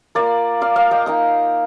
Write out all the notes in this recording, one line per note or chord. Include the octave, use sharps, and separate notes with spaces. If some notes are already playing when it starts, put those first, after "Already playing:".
A#3 F4 A#4 D5
D5 F5
D5 F5
D#5 G5
A#3 D#4 D#5 G5